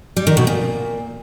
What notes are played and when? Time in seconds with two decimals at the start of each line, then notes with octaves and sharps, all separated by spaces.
0.17 G3
0.27 D#3
0.37 B2
0.47 A#2